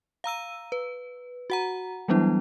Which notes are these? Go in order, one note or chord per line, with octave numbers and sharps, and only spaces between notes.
F5 A#5 E6 D#7
B4
F#4 F#5 A#5
E3 F#3 G3 B3 D4 E4